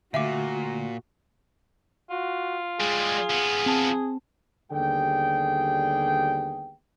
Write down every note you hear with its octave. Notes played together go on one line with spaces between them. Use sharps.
A#2 D3 A3 F#4 E5 F5 D6
F4 F#4
G3 G#3 G#4
F3 B3
C4 A5
D#2 D3 G3 B3 G#4 G5